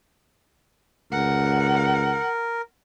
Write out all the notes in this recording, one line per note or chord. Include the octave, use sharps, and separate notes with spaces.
C#2 A#4 F#5